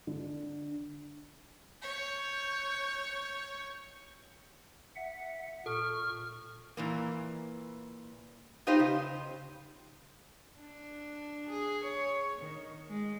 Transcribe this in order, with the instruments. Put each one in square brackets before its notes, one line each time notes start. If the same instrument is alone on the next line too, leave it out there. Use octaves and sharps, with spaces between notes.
[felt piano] D3
[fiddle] C#5 [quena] G6
[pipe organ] E5 F#5
[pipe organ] A#2 C#6 F6 [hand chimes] A4
[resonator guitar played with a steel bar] A#2 E3 A#3
B3 D#4 F4 G4 C5
C#3
[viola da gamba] D4
G#4
C#5
D#3
G#3